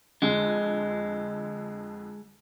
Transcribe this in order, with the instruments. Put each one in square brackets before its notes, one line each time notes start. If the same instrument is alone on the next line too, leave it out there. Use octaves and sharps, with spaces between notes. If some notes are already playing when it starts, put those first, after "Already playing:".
[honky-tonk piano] F2 D3 [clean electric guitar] G#3